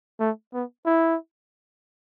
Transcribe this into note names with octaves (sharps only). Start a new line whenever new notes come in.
A3
B3
E4